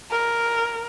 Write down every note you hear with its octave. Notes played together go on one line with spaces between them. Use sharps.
A#4